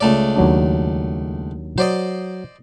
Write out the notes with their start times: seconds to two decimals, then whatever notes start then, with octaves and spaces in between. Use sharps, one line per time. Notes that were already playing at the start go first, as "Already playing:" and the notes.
0.01 C#2 A3 D5
0.36 D#2 F#3 D4
1.78 F#3 C5 D5 D#5